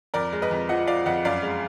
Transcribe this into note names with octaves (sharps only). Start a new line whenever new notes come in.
F2 A#4 D5
G#3
B4 D#5
F2
F3 D#5 F#5
F3 D5 F5
F2 D#5 F#5
F#2 D5 F5
G#3